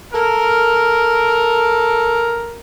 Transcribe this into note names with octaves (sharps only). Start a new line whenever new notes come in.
A4 A#4